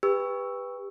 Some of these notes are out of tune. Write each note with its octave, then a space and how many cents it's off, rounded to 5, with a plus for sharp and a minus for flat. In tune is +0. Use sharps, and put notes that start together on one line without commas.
G4 +30 B4 +0 E6 +0